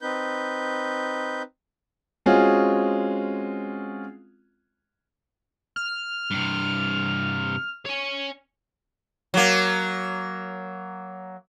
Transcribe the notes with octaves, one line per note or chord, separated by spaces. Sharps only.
C4 D#4 B4 G6
G#3 C4 C#4 F4 F#4 G#4
F6
G2 C3
C#5 G#5
F#3 A#3